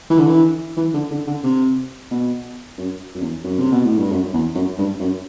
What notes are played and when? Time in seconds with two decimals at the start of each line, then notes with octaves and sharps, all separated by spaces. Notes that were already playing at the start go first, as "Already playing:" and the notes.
0.10 E3
0.18 D3
0.27 E3
0.77 E3
0.94 D3
1.10 D3
1.27 D3
1.44 C3
2.11 B2
2.78 F#2
3.15 F#2
3.21 E2
3.44 F#2
3.59 C3
3.72 B2
3.84 A2
3.98 G2
4.11 F#2
4.33 E2
4.55 F#2
4.78 G2
4.99 F#2